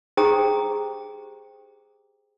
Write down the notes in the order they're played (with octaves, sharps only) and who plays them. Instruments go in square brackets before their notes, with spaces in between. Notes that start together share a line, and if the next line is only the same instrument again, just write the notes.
[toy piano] G4 G#4 C5 G5 A#5 D#6